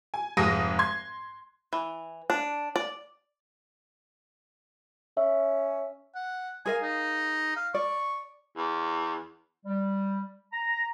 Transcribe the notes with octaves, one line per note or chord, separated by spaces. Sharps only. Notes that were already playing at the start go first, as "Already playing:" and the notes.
G#5
F1 G#2 G#3 D#6 A#6 D#7
C6 G#6
E3
D4
D5
C#4 E5
F#5
G#4 A#4 F5 G#5
D#4
F5
D5 C#6
E2
G3
A#5